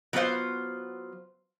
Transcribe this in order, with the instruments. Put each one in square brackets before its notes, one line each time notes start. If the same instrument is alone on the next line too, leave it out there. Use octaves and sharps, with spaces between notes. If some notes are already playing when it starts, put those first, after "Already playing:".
[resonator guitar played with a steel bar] F#3 B3 F4 G#4 C5 F5